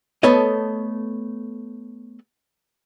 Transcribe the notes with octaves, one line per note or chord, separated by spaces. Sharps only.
A3 B3 A4 C#5 D#5